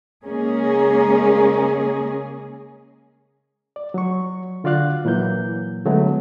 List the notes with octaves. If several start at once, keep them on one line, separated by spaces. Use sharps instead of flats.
C#3 G#3 A#3 C#4 G#4
D5
F#3 C#6
D3 F4 F#4 D5 F5 F#6
A#2 E3 F#3 A#3 G6
D3 F#3 G#3 A3 B3